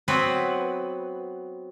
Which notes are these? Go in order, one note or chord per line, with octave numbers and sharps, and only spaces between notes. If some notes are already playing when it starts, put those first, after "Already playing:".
F#3 B3 C4 B4